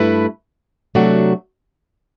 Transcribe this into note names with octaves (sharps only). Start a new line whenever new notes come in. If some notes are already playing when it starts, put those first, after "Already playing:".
Already playing: G2 A3 E4 B4
C3 F#3 A3 D4 F#4